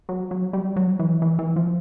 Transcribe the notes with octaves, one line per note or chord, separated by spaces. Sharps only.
F#3
F#3
G3
F#3
E3
E3
E3
F3